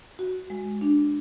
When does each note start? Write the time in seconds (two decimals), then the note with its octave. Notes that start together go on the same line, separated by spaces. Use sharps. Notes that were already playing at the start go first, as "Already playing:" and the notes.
0.19 F#4
0.50 G#3
0.81 D4